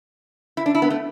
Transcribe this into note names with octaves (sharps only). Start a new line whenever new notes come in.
E4
D4
E4
B3
A3